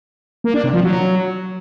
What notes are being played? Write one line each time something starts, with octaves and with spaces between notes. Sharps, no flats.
A#3
D4
C3
F3
F#3